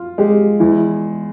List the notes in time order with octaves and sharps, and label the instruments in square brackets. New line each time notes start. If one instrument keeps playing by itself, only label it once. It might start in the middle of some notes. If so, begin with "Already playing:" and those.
Already playing: [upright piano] F4
[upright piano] G#3 [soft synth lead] G4
[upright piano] E2 [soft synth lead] E4
[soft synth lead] E4